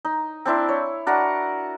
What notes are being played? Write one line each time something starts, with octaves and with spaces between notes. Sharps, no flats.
D#4
C4 D4 E4 C5
C#5
D4 F#4 A#4 F#5